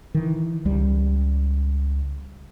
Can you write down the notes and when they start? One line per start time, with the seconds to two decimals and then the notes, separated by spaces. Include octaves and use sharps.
0.14 D#3 E3
0.65 C#2 G3